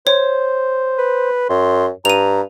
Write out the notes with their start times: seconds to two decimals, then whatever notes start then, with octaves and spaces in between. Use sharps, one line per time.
0.07 C5 C#5
0.98 B4
1.49 F#2 C6
2.05 G2 A#5 D#7 F7